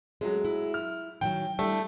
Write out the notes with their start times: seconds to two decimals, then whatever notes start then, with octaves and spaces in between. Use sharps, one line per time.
0.21 F#3 G#3 A3 C#4
0.45 E4
0.74 F6
1.21 D#3 E3 F#3 G5
1.59 G3 A3 D4 E4